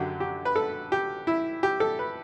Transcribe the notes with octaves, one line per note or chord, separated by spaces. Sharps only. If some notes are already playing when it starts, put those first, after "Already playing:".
Already playing: F#2 D3 F#3 G4
G4
B4
A4
G4
E4
G4
A4
B4